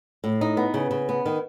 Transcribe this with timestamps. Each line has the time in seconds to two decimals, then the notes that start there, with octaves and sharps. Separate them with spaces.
0.24 A2
0.41 D#4
0.57 B3
0.74 C#3
0.91 C#3
1.09 B3
1.26 D#3